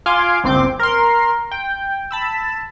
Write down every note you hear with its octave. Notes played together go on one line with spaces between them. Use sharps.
F4 F5 G#5 C6 D6
G1 C#2 C4 C6 D6
A#4 C6
G5
A5 B5 E6